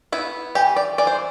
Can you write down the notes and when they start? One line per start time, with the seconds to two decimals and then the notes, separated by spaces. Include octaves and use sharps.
0.12 B3 E4
0.55 E3 G4
0.76 D5
0.98 E3 D5
1.07 C5